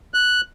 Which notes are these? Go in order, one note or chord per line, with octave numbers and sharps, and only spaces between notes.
F#6